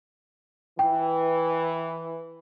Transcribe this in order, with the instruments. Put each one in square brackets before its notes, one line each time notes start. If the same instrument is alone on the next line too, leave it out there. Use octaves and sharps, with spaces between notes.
[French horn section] E3 [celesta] G5